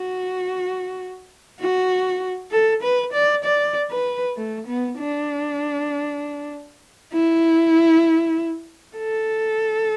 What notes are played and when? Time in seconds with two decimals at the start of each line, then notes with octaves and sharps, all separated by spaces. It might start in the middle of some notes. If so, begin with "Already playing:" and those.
Already playing: F#4
1.60 F#4
2.51 A4
2.82 B4
3.13 D5
3.44 D5
3.90 B4
4.36 A3
4.67 B3
4.98 D4
7.13 E4
8.97 A4